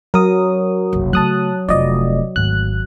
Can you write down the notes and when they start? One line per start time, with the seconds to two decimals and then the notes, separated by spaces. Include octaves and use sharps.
0.14 F#3 A#4 D#6
0.93 F#1 C2
1.13 C#3 F#3 A3 A5 D#6 F#6
1.68 F1 F4 D5 D#5
2.36 G#1 D2 F#6